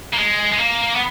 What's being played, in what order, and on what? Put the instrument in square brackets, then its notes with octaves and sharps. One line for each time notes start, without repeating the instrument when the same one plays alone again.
[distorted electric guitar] A#3
G#3
G#3
A#3
B3